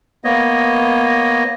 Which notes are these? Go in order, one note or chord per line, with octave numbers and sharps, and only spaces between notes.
A#3 B3 C#5 D#5